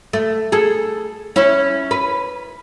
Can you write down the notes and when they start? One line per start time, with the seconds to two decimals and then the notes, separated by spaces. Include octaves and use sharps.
0.13 A3
0.52 G#4 A4
1.36 C#4 E4
1.91 B4